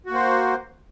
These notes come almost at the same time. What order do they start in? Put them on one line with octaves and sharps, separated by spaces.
F#4 A#3 C5